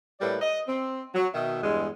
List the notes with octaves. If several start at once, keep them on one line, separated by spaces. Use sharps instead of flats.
A2 G3 A#3 B4 D5
D#5
C4
F#3
B2 D#3 E5
E2 G2 G#3